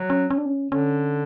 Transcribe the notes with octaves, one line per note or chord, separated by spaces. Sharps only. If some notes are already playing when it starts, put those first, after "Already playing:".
Already playing: F#3
C#4
C#4
D4
C#4
D3 C#4